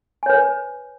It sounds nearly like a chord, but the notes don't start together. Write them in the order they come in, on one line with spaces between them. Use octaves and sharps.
G#5 C#5 B4